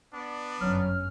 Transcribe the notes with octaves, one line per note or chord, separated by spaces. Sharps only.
B3 D4 D5
G1 F#2 F#3 C#4 F6